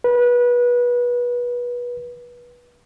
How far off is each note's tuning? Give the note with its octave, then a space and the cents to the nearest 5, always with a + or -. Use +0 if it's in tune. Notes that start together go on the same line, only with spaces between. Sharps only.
B4 -25